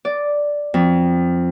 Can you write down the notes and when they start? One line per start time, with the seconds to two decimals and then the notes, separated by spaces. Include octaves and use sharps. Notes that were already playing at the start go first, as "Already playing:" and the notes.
0.05 D5
0.74 F2